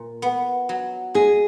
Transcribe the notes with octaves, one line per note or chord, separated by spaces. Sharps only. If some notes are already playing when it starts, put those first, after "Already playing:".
Already playing: A#2
B3
F#3
G#3 G#4